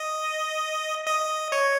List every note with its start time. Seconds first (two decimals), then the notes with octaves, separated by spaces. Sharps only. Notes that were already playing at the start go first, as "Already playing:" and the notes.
Already playing: D#5
1.07 D#5
1.52 C#5